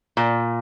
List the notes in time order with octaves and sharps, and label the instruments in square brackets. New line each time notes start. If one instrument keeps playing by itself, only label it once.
[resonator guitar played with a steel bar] A#2